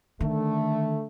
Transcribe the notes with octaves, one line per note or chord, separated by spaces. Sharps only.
D3 D#3 A3